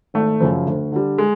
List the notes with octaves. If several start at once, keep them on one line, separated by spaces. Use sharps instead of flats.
G#1 A3
F#2 C#3 F3
D2
D3 G3
G#3